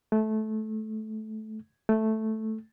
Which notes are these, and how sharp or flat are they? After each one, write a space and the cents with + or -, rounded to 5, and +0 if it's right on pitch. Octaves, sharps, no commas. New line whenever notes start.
A3 -20
A3 -5